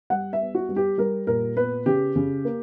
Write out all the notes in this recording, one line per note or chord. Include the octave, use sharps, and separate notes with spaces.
G3 F#5
E5
B3
F#4
G3
G4
G3 A#4
A#2 A#4
B3 B4
C#3 G4
C#3
A#3